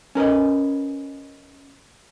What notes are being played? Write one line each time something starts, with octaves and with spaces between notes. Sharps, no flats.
C#4 A#4 B4 D#5